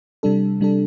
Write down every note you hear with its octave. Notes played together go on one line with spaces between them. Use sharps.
C3 G3 D4 A4
C3 G3 D4 A4